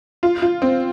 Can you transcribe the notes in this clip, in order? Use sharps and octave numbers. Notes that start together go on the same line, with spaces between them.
F4
F4
C4